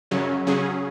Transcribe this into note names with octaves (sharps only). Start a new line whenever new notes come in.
F#2 C#3 F#3 C#4
C#3 F#3 C#4 G#4